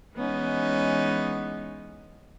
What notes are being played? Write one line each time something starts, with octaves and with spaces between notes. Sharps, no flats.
E3 G#3 B3 C#4 D#4